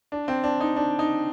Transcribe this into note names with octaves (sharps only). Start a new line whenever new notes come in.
D4
C4
D4
D#4
D4
D#4